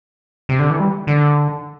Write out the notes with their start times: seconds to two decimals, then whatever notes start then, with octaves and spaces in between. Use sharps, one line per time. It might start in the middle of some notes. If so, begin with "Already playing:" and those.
0.49 C3
0.59 D3
0.70 E3
0.80 G3
1.07 D3